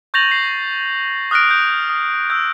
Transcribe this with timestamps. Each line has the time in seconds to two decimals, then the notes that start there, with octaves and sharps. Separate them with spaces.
0.14 C#6 G6 A6 A#6 F7 F#7
0.31 C7
1.31 D#6 F6 F#6 A#6 D7
1.51 G6
1.89 D#6
2.30 E6 G6